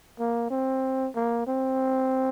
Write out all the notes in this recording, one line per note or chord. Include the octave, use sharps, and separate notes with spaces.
A#3
C4
A#3
C4